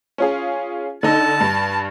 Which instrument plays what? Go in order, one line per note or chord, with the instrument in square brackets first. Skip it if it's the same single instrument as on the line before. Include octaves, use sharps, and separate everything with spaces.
[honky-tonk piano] C#4 F4 G#4
[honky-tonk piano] D3 D#4 [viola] A5
[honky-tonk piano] G2